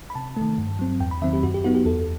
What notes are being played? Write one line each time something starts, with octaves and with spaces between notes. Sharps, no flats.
B5
C3 A5
D#3 A3
G2
F#3 C4
E2 G5
B5
D#3 F#3 C4 E5
G4
F#2 F#4
G4
F#3 B3 D#4 F#4
G4
E2 A4